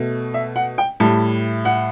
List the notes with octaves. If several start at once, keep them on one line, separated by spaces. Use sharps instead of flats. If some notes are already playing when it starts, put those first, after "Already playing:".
Already playing: B2 A3
E5
F#5
G5
A2 G3 A5
F#5